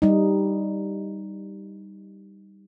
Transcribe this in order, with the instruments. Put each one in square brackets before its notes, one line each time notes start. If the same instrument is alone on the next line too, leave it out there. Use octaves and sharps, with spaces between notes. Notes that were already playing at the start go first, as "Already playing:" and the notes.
[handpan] G3 D#4